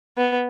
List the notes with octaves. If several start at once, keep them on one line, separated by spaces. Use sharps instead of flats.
B3